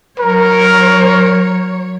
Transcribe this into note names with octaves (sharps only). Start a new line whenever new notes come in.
F#3 A#4 C#5